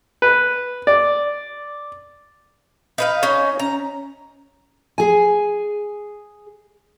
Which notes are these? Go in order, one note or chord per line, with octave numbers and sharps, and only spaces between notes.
B4
D5
D#4 B4 F5
C#4 D#4 C#5
C#4 A#5
G#4 G#5